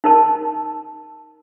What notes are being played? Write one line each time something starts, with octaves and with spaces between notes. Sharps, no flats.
D#4 A#4 A5